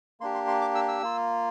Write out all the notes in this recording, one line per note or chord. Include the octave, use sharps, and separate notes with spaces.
A#3 D4 G4 C6
C6
C6
D6
E6
E6
A#3 F4